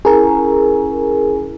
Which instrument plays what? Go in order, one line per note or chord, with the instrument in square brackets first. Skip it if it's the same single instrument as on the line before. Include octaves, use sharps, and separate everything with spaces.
[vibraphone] C#4 E4 G#5 [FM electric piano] G#4 A#4